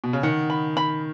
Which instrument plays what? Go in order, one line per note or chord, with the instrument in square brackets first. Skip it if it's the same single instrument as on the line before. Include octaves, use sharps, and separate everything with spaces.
[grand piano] B2
C#3
[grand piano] D#3 [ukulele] F#5
[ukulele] B5
B5